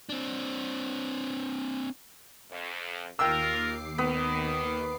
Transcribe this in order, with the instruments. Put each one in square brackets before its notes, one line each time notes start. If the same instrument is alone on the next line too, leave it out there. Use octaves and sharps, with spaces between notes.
[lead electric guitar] C4 D4
[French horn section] F2
[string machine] D#2 D6 C7 [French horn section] F4 A#4 [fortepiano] G5 E6
[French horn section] D#3 [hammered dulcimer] B3